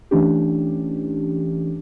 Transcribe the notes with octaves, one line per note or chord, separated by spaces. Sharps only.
E3 A3 C#4 D4 G4